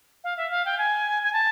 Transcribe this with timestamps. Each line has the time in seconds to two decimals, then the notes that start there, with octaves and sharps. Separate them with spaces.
0.24 F5
0.37 E5
0.50 F5
0.65 G5
0.78 G#5
1.23 G#5
1.33 A5